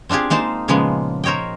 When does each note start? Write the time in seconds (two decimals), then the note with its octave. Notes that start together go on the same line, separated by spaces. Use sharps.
0.09 C4 D4 F4 G4 G#4
0.30 G#3 A#3 D#4 C5 A5
0.68 A#2 C#3 F3 G#3 A#3 B3
1.24 A#4 C5 C#5 D#5 G5